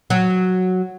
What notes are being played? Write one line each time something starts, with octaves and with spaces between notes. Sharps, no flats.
F#3